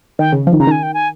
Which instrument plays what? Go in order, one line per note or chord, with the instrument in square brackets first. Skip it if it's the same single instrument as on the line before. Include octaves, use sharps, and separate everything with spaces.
[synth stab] D#3 [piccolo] G5
[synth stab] C#3
F3
D#3
[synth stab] C#3 [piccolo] A#5
[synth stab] D#3 [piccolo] G#5
[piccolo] G5
G#5